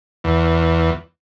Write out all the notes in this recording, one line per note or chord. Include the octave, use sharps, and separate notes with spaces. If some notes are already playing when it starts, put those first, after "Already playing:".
E2